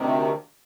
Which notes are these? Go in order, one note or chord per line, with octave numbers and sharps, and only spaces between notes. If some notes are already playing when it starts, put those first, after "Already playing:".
Already playing: D2 C3 D#3